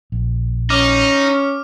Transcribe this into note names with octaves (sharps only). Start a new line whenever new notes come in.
A#1
C#4 D#4 D6 F6